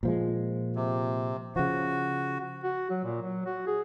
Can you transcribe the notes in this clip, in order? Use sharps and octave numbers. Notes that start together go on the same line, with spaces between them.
A#2 F3 G#3
C3
C#3 F3 F#4
F#4
F#3
A#2
F#3
F#4
G#4